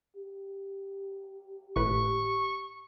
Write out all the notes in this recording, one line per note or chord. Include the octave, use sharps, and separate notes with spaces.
G4
G#1 A2 B4 C#6